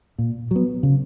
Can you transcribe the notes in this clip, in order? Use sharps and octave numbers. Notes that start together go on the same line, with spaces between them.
A#2
F#3 B3
C#3